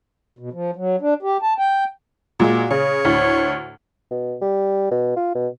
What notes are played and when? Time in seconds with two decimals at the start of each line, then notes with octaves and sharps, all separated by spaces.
0.39 B2
0.53 F3
0.76 F#3
1.01 D4
1.22 G4
1.42 A5
1.58 G5
2.40 A#2 G#3 F#4
2.71 C#3 C#5
3.05 D2 A2
4.10 B2
4.41 G3
4.91 B2
5.16 F4
5.35 B2